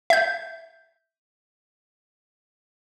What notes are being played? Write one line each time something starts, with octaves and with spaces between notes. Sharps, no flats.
E5 G6